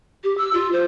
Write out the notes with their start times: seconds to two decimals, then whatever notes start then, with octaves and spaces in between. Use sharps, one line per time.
0.24 G4
0.37 E6
0.53 F4
0.72 C5